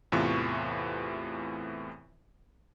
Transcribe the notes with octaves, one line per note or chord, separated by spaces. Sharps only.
E2 A2 C3 E3 F4 C#6